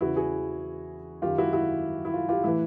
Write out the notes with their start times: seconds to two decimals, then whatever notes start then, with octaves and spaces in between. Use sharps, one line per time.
0.01 E2 C#3 E3 E4 F#4
0.16 F#4 G#4
1.22 F#2 D#3 F4 G4
1.38 E4 F#4
1.53 E4 F#4
2.05 E4
2.14 F4
2.29 F4 G4
2.44 A2 E3 E4